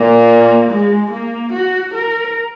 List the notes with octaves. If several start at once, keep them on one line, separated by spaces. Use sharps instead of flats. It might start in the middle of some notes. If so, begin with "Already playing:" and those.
Already playing: A#2 A#3
G#3
A#3
F#4
A#4